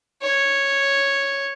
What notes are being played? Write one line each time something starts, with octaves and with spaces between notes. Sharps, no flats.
C#5